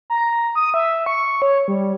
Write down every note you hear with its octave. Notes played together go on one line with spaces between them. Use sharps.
A#5
D#6
E5
C#6
C#5
G3